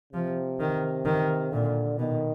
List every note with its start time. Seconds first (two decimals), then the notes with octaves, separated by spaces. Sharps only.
0.13 C3 F3
0.60 D#3
1.05 D#3
1.52 A#2 D3
1.99 B2 D#3